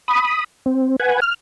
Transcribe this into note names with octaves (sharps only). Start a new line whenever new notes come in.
B5 D#6
C4
B4 F#5 G#5
F6